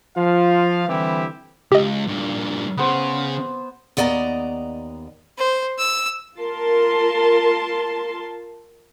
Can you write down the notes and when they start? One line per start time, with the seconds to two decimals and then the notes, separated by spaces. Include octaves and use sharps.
0.16 F3 F4 F5
0.89 D3 E3 G3 C4 E4 G4
1.72 C#2 G4 D#5
2.07 G2 A#2
2.77 C#3 B3 C5
3.97 D#2 B3 D5 D#5 A#5
5.38 C5
5.78 E6
6.38 F4 A#4 A5 C6